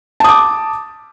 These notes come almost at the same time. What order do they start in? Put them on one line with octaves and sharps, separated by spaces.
A5 D#6 D6